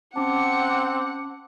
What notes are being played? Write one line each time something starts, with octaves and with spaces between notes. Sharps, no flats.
C4 C#4 F#5 A5 D6